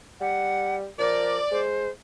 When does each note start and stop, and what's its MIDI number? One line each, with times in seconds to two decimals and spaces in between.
0.21 0.86 55
0.21 0.76 78
0.98 1.40 53
0.98 1.38 70
0.98 1.60 74
1.51 1.89 56
1.51 1.89 72